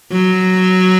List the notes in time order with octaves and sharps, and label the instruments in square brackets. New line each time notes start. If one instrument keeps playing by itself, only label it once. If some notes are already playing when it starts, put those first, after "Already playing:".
[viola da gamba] F#3